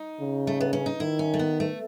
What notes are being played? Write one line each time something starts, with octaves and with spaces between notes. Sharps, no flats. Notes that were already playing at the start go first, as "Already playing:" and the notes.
Already playing: D#4
C#3
A3
B3
C#4
D#4
D#3 E4
C#4
A3
B3
A3